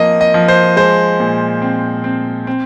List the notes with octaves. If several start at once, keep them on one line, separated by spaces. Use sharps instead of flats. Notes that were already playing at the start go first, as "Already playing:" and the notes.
Already playing: F3 A#3 D#5
D#5
F3
C5
G#3 C5
A#2
C4
C4
C4